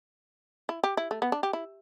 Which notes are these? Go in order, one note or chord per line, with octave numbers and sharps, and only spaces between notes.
E4
G4
E4
A3
B3
D4
G4
E4